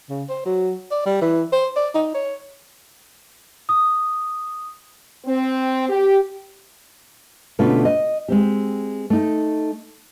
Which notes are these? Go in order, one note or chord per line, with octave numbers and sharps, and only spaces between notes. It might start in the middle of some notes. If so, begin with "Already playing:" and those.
C#3
C5
F#3
D5
G3
E3
C5
D5
D#4
C#5
D#6
C4
G4
B2 D3 A3 C#4 F4 B4
D#5
G#3 C4 G4
A3 D#4